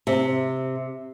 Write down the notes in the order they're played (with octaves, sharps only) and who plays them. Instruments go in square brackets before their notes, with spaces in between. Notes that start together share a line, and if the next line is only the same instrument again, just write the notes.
[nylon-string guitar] C3